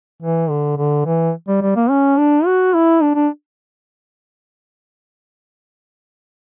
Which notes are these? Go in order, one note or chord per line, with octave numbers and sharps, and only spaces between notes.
E3
D3
D3
E3
G3
G3
A#3
C#4
D4
F#4
E4
D4
D4